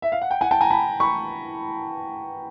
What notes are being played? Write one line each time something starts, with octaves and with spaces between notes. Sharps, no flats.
E5
F5
F#5
G5
F#5 G#5
G5 A5
G#5 A#5
A5 B5
B5 C#6